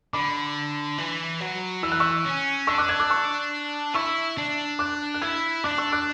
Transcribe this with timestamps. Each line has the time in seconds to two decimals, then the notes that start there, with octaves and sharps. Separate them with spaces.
0.13 D3 B5 D6
0.98 E3
1.41 F#3
1.83 E3 E6
1.92 F#6
2.00 C#6 E6
2.25 C#4
2.67 D4 C#6 E6
2.78 D6 F#6
2.89 E6 G#6
3.00 D6 F#6
3.10 C#6 E6
3.94 E4 C#6 E6
4.38 D4
4.79 D6 F#6
5.14 F#6
5.22 E4 E6 G#6
5.64 D4 D6 F#6
5.78 C#6 E6
5.92 D6 F#6